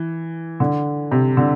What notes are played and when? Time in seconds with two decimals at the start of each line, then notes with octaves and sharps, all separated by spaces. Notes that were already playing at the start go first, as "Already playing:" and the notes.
Already playing: E3
0.60 D3
1.11 C3
1.37 D3